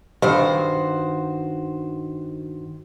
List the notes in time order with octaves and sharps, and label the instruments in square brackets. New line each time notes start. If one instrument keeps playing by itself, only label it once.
[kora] G2 [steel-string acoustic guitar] D#3 F#4 C5